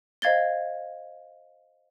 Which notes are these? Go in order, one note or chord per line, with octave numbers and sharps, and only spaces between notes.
C5 D#5 F5 G#6 A6 G7